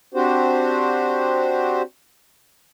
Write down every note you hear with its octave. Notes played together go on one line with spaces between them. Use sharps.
C4 D4 F#4 G4 C5